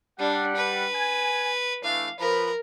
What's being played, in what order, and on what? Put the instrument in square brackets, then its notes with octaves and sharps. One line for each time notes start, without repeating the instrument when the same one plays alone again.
[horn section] G3 F#5 [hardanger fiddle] D4
[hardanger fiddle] B4
[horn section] G#5
[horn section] E3 A3 D4 [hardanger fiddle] F5
[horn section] F3 B4 B5 [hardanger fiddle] A#4